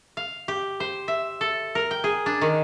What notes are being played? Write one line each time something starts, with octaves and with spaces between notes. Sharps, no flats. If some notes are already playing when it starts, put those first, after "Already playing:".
F5
G4
C5
E5
A4
A#4
G5
G#4
D4
D#3